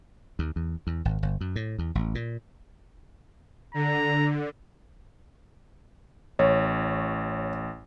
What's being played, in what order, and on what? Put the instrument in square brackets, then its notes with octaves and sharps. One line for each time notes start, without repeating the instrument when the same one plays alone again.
[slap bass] D#2
E2
E2
G#1
G1
F#2
A2
E2
A1
A#2
[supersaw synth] D3 [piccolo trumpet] A#5
[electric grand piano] A1 [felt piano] C#5